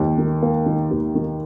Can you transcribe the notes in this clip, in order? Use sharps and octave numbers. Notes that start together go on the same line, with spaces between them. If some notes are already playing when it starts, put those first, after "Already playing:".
Already playing: D#2 D#3
D#3
A#3
D#3
D#2
D#3